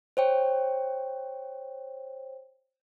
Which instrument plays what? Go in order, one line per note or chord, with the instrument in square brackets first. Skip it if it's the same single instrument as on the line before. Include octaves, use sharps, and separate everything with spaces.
[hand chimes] C5 C#5 G5